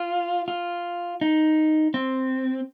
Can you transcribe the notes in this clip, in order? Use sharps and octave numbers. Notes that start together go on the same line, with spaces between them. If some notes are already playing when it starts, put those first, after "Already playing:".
Already playing: F4
F4
D#4
C4